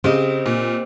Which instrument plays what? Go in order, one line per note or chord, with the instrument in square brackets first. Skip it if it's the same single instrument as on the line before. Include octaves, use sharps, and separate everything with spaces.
[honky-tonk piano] C#3 [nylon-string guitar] C4 G4 D#5
[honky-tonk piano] A#2